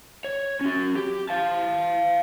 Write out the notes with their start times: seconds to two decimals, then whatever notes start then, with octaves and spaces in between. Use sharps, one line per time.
0.24 C#5
0.61 C#4 F#4
0.96 G4
1.29 F5 A5